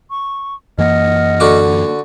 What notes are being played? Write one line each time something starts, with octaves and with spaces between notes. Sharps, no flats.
C#6
F#2 E3 A#3 D#5 F#5 F6
D3 F#4 D6